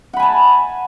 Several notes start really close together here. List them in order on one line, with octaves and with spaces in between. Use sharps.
F#5 B5 G#5 A5